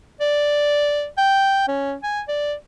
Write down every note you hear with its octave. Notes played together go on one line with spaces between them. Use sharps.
D5
G5
C#4
G#5
D5